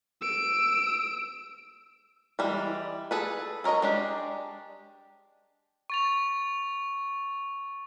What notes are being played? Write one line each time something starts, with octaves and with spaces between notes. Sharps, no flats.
E6 D7
E3 G3 G#3
G#4 A4 B4
A4 A#4 C#5 D#5 A#5
G#3 D4 G4
C#6 A6 F7